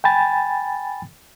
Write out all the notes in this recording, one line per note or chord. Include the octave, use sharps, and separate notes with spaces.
G5 G#5 B5 A6